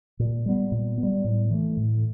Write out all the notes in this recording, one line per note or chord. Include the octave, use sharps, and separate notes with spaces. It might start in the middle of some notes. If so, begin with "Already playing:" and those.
A#2
G3 B3
A#2
B3
G3
A2
E3 A3
A2